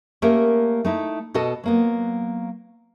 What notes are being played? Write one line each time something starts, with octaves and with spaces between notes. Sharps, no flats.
A3 A#3 C#4 G4 A#4
A3 D#4 E4
B2 F#4 A4 D#5
F#3 A#3 B3